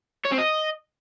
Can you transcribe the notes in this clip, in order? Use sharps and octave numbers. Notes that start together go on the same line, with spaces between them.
C#5
C4
D#5